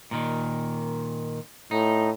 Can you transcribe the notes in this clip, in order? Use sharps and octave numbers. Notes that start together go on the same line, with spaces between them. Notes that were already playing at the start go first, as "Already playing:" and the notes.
A#2 D#3
A2 D#4